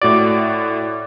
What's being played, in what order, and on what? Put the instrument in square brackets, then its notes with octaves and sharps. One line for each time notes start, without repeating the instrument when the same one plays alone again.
[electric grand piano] A2 F#4 D7 [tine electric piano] D5